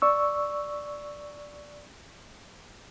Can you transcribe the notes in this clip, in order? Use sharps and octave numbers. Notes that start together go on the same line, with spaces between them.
D5 C#6 E6